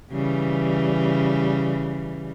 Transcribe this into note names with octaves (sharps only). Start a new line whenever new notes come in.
C#3 E3 G3